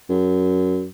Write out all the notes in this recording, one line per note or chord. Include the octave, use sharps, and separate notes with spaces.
F#2